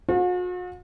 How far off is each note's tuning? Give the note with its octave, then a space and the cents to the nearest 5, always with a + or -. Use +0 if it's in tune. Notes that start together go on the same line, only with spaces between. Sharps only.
F#4 -45 A4 -45 C5 +0